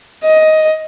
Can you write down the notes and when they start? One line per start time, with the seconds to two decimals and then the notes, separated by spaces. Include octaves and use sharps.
0.24 D#5